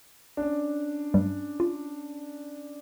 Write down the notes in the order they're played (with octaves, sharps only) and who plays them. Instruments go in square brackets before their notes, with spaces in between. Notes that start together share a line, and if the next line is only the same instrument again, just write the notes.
[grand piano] C#4 D4
[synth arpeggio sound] G2 G3
F4